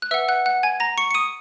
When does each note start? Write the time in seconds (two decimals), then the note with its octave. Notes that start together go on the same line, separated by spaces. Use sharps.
0.02 F#6
0.11 B4 E5 F#5 E6
0.28 F#5 F#6
0.46 F#5 F#6
0.63 G#5 G#6
0.80 A#5 A#6
0.98 C#6 C#7
1.11 C#7
1.14 D#6 D#7